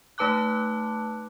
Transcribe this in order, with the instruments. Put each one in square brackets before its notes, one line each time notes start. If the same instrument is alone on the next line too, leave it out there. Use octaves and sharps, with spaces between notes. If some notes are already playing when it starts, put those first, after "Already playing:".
[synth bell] A3 D#4 B4 A5 D6 F#6